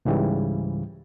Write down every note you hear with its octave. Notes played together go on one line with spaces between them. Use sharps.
C#2 G#2 C#3 E3 G3